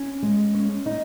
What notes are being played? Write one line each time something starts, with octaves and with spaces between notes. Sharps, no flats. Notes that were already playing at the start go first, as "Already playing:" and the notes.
Already playing: C#4
G#3
C#4
D#4